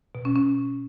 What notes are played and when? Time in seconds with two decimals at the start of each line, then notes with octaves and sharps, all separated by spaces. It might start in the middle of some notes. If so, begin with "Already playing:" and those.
0.15 B2
0.25 C#4
0.36 C#4